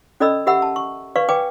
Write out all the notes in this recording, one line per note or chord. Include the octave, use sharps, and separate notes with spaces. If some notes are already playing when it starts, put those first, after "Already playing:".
C#4 A4 D5 D#5 B5 E6
G4 A#4 E5 F#5 B5 E6
A5
C#6
B4 D5 F5 C#6
B4 D5 G5 G#5 D6